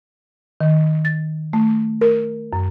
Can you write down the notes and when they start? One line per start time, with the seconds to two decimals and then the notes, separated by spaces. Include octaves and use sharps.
0.60 D#3
1.05 A6
1.53 A3
2.01 A#4
2.53 F#2